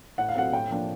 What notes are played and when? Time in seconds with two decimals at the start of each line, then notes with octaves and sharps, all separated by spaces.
0.18 A2 F#5
0.29 F5
0.36 F#3 A3 C4 F#5
0.53 A2 G5
0.71 F3 A#3 D4